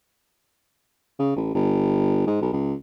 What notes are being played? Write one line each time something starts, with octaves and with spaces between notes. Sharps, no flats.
C#3
A1
G1
G#2
B1
C#2